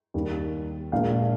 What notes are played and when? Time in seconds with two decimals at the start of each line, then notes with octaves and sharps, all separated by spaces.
0.14 D#2 D#3 G3
0.92 A#1 A#2 G#3 F5